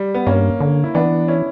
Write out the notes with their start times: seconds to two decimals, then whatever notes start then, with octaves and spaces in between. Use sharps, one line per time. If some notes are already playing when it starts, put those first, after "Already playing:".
Already playing: G3
0.14 B3
0.27 G2 A#3 C#4
0.60 D3
0.84 E4
0.95 E3 B3 D4
1.28 C#4 E4